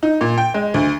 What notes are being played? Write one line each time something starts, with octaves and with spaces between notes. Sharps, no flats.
D#4
A#2
G5
G#3
D2